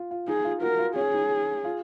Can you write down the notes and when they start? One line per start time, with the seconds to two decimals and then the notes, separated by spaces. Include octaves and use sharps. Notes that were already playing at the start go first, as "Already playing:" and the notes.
Already playing: F4
0.11 F4
0.28 D#4 G#4
0.45 F4
0.62 F#4 A#4
0.79 F4
0.96 C#4 G#4
1.14 D#4
1.65 F4